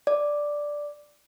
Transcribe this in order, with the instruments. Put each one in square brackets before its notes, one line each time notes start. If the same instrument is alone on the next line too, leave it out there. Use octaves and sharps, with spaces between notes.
[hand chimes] D5